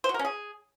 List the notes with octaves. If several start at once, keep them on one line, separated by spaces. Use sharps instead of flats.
C5
F#4
A#4
C#4
G#4